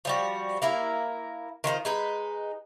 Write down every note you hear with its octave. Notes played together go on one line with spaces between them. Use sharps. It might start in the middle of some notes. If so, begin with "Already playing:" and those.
F3 G3 F#4
A#3 E4 A#4
D#3 F4 A#4 C5
G#3 D#4 B4